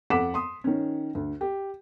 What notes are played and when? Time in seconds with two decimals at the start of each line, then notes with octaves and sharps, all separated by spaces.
0.10 F2 A4 F#5 D6 B6 E7
0.34 C6 D#6
0.64 D#3 C#4
1.15 D2
1.41 G4